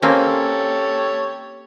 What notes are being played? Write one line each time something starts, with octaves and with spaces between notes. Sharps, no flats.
A#3 C4 C#4 G4 A4 C#5